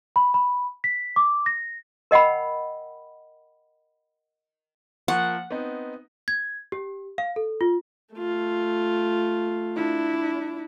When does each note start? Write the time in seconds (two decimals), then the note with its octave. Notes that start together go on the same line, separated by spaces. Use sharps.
0.16 B5
0.34 B5
0.84 B6
1.16 D6
1.46 A#6
2.11 A#4 D#5 F#5 G5 B5
5.08 F3 A#3 F#5 C#6
5.51 B3 C4 D#4
6.28 G#6
6.72 G4
7.18 F5
7.36 A4
7.61 F4
8.15 A3 F4
9.76 D4 E4